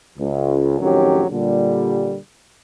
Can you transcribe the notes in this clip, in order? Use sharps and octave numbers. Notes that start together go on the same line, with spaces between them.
C#2
F2 A2 D#3 F#3 C#4 G4
A#2 D3 G3